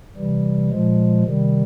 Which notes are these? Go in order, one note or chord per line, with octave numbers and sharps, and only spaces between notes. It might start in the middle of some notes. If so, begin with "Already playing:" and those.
C3 E3 G3
A#2 F3 G#3
C3 D#3 G3